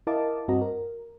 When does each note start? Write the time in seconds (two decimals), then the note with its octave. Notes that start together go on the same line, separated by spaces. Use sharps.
0.07 E4 A#4 D#5 F5 A5 D6
0.48 G2 C4 F#4 D#5 A#5
0.61 A#4